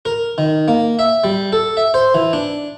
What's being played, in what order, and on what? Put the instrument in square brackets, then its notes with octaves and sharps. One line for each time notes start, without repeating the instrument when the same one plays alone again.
[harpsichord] A#4
D#3
A#3
E5
G3
A4
E5
C5
E3
D4